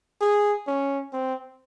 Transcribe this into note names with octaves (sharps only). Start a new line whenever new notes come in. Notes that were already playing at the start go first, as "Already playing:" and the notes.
G#4
C#4
C4